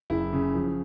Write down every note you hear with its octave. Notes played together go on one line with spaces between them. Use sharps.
F#1 E4
C#3
F3